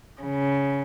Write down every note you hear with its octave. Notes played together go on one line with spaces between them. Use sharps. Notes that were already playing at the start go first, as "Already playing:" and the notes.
C#3